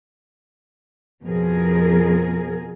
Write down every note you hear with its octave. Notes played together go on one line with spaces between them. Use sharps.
F2 B2 F3 G#4 A#4